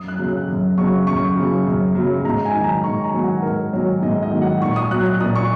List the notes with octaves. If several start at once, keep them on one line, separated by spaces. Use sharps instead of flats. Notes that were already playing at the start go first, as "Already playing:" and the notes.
Already playing: F#2 D#6
F#6
C#3 F#3
F#6
F#2
C#3 F#3 C#6
F#2 C#6
C#3 F#3
F#2
C#3 F#3
G#2 A#5
G#5
D#3 F#3
A#5
G#2 C#6
A#5
D#3 F#3
F#5
G#2 A#4
D#3 F#3 C#5
G#2 D#5
D#5
D#3 F#3
F#5
A#2 C#6
D#6
F#3 F#6
F#6
A#2 D#6
C#6